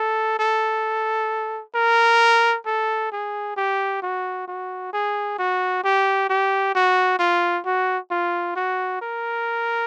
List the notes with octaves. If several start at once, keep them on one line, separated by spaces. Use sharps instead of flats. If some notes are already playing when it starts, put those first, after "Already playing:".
Already playing: A4
A4
A#4
A4
G#4
G4
F#4
F#4
G#4
F#4
G4
G4
F#4
F4
F#4
F4
F#4
A#4